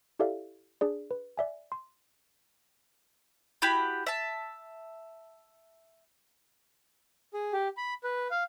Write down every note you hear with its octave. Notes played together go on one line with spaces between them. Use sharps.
E4 G4 A4 D5 E5 F5
D4 G#4 D5
B4
D5 E5 G#5
C6
E4 F#4 G4 B5
E5 A5
G#4
G4
B5
B4
F5